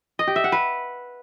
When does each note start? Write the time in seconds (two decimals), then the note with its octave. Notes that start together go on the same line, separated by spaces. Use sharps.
0.19 D#5
0.27 G4
0.36 E5
0.44 F#5
0.52 B4